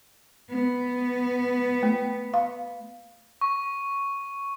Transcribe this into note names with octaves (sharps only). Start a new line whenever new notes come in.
B3
A3
F5
C#6